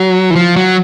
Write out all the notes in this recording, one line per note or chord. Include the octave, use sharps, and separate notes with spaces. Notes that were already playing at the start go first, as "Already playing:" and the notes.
Already playing: F#3
E3
F3
F#3